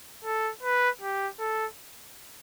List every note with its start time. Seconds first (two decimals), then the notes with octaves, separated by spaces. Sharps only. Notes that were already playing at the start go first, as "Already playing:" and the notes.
0.25 A4
0.63 B4
1.01 G4
1.40 A4